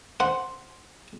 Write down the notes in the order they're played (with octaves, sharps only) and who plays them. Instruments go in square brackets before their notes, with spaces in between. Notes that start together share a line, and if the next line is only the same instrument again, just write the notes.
[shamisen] C5 [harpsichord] F#5